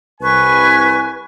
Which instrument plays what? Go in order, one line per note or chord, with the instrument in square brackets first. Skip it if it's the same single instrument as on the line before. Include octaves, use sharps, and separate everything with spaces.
[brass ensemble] C2 G#5 [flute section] B4 C#6